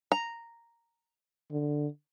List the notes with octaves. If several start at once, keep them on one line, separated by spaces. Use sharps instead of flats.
A#5
D3